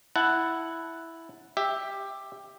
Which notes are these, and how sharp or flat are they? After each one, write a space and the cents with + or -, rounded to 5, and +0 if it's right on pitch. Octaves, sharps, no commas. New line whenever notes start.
E4 +0 F#5 +0 A5 +5
G4 +10 E5 +0